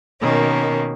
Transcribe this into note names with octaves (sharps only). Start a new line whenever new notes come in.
B2 D#3 A#3 C#4